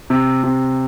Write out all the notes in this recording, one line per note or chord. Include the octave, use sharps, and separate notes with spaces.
C3
C3